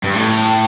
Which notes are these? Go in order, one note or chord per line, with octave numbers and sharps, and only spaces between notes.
G2
A2